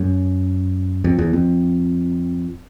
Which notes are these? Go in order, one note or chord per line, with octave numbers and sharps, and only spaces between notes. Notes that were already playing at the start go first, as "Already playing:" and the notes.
Already playing: F#2
F2
E2
F2